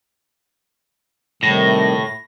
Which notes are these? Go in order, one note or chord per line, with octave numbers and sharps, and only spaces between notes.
A2 C3 D#3 G3 A#6